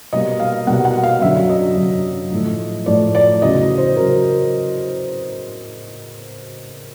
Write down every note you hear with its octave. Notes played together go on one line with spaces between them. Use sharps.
B2 G3 A#3 D#5
F5
B2 G3 A#3 F#5
F#5
F5
F#2 D3 F#3 E5
D#5
F#2 D3 F#3
A2 F3 A3
A2 F3 A3 D5
D5
E2 C#3 F#3 D#5
C5
C#3 F#3 A#4